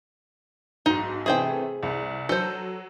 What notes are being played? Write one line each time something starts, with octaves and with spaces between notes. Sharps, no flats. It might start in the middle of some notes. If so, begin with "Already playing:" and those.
B1 G#2 D#4
C3 E3 A3 G#4 C5 G5
C2
F#3 A4 C5